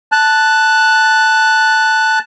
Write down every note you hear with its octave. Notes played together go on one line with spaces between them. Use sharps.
A5 F#6